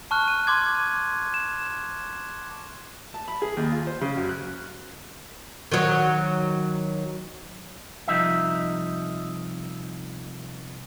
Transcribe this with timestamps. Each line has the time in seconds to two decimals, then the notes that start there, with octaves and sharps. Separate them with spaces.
0.11 A5 C#6 F6 F#6
0.28 D#7
0.47 C6 D6 G#6
1.34 E7
3.14 A5
3.28 B5
3.42 G#4
3.57 D#2
3.72 F4
3.87 C5
4.01 C#3
4.17 F#2
4.29 F#6
5.72 D#3 F#3
8.08 C2 F3 D#4 E5